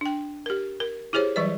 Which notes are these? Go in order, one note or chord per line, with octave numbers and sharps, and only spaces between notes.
D4 G5
G4 A#4
A#4
E4 G4 G#4 C5 C#5
E3 F#3 G3 B4 D5